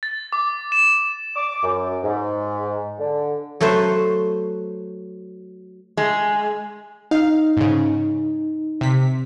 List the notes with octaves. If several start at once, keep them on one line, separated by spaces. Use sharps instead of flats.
A6
D6
E7
D6
F#2
G#2
D3
F#3 A3 B4 C5
G#3
D#4 F5
G#2 C#3
C3 B6